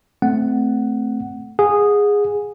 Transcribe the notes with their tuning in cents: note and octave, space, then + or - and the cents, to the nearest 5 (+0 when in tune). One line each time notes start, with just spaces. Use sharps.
A3 +0 C4 -10 F#5 +5
G#4 -10 F#5 -35